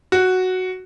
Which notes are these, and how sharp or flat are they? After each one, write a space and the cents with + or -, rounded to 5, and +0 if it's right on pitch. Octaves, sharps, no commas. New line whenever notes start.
F#4 +0